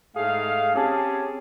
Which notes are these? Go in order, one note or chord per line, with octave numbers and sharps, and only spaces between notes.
G#2 A3 G#4 F5
C4 C#4 G4 G#4 A5